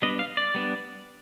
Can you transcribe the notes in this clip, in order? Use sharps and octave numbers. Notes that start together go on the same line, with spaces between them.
G3 B3 D4 D#5
F5
D5
G3 B3 D4